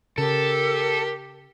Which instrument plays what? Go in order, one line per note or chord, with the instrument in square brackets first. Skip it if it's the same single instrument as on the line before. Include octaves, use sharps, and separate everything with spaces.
[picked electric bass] C#3 [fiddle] G4 [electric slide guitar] A4 [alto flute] A#4